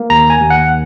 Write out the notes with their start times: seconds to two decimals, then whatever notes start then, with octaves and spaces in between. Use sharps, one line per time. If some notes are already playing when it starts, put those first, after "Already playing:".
Already playing: A#3
0.10 D#2 A#5
0.30 G#5
0.40 D#2
0.50 F#5